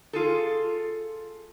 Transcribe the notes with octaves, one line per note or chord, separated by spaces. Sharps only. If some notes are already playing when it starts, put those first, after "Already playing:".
F4 G#4 A4